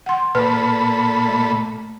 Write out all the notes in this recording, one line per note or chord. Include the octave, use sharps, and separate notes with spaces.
F#5 C6
A#2 A4 B4 B5
A3